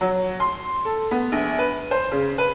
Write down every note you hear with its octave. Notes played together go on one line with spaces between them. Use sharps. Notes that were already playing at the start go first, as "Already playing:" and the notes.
F#3
C6
A4
B3
A#1
B4
C5
C#3
B4